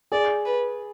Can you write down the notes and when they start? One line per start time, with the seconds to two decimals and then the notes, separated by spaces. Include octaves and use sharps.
0.12 G#4 D5
0.45 B4